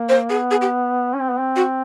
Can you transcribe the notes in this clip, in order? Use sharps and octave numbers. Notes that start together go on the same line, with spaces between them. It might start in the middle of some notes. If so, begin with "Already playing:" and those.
Already playing: A#3
C5
B3 G#4
G#4
G4
C#4
C4
B3
C4
F#4